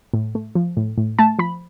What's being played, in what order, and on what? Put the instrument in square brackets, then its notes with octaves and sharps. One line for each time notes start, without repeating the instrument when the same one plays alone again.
[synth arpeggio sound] A2
A3
F3
A2
A2
A3 A5
F3 B5